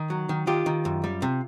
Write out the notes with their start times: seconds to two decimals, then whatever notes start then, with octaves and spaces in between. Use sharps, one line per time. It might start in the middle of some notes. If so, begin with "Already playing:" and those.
Already playing: D#3
0.10 F#3
0.29 D#3
0.47 D#3 F4 G4
0.66 D#3
0.85 F#2
1.04 G3
1.22 C3